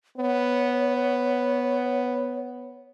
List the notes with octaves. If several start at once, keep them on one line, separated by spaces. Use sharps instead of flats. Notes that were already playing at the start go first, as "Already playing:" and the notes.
B3 C#5